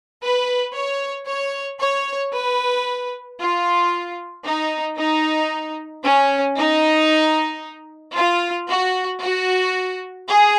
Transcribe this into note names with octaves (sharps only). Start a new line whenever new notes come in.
B4
C#5
C#5
C#5
B4
F4
D#4
D#4
C#4
D#4
F4
F#4
F#4
G#4